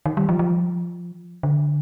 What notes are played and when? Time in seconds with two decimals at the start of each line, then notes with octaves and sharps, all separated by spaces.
0.06 D#3
0.17 G3
0.29 F3
0.39 F3
1.43 D3